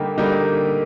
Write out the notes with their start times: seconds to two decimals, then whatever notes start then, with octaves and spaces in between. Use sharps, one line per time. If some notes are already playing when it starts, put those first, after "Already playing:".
Already playing: D3 G3 A#3 D#4 G4
0.17 D3 G3 A#3 D#4 G4